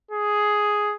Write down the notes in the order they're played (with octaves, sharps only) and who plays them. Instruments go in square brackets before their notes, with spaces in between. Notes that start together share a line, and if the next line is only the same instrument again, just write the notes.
[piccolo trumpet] G#4